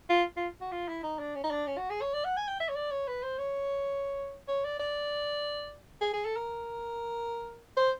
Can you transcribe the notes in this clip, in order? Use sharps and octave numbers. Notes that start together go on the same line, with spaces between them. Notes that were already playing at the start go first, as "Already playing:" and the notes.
F4
F4
F#4
F4
E4
D#4
D4
C#4
D#4
D4
C#4
F#4
G#4
C#5
D5
F#5
G#5
G5
E5
C#5
D5
C#5
B4
C5
C#5
C#5
D5
D5
G#4
G#4
A4
A#4
C5